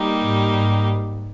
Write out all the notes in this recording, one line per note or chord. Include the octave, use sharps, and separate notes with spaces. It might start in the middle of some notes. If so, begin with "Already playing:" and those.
Already playing: G3 A#3 D#4 G4
G#2
G#2